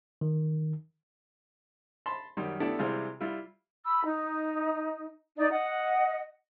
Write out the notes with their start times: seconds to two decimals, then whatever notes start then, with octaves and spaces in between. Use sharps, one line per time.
0.21 D#3
2.06 A5 B5 C6
2.37 F#2 D#3 G3
2.60 A3 B3 D4 E4 G4 A4
2.79 C3 E3 G3 G#3 F4
3.21 G3 E4 F4
3.85 B5 E6
4.05 D#4
5.37 D#4 D5
5.51 D#5 F#5